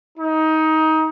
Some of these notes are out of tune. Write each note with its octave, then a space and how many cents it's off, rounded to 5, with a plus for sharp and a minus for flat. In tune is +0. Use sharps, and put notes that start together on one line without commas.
D#4 +20